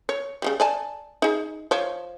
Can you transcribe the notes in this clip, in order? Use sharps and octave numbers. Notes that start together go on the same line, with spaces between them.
C#5
C#3 F#3 G3
D5 G#5 A5
D#4 G#4
F3 C#5